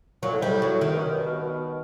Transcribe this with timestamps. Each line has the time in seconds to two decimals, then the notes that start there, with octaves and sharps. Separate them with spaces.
0.22 A#2 F#3
0.32 A2
0.40 G#2 G3
0.49 A2
0.62 F#3
0.81 F#2 D#3
0.92 G2
0.97 F#2
1.11 G2
1.26 B2
1.40 B2